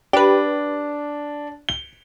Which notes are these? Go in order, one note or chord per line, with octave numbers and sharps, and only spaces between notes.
D4 G4 B4
G7